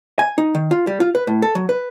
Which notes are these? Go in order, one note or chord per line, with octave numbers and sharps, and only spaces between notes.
G#5
D#4
D#3
F4
G3
F4
B4
A2
A4
F#3
B4